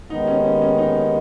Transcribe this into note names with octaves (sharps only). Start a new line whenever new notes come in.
D#2 D#3 G#3 B3 D#4
C#4
C#4
C#4
D#4